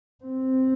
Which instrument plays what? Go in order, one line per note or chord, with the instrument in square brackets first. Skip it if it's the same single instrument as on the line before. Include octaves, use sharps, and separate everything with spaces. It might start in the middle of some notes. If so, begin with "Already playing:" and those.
[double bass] C4